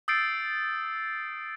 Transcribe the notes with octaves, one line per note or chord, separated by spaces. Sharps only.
D#6 E6 G6 A6 C7 D7